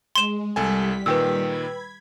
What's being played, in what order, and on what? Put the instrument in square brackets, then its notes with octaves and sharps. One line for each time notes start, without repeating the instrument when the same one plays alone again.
[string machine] G#3 [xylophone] C6 E7
[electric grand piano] C2 A4 G#5 [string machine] G3 B6
[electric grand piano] A#2 D#3 [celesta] B4 G5 E6
[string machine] B5 G#6